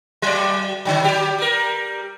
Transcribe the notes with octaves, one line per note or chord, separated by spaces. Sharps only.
F#3 D5
D3 D#3 F#3
F#3 G4
G3 A#4